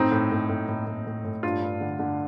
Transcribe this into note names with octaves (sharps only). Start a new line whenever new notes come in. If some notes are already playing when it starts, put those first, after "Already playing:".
Already playing: A2 C4 D#4
A2
A2
A2
A2
A2
A2
A2
G2 D4 F4
G2
D3
D3